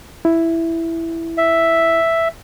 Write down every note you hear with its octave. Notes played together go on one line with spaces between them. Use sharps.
E4
E5